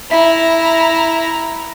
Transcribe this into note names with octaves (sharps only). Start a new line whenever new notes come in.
E4 E5 A#5